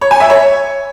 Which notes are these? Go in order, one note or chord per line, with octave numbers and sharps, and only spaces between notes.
C#5
G#5
E5
C#5